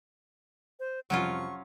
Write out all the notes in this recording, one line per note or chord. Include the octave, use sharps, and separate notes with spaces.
C5
C2 F2 F3 F#3 C#4 F4 C#6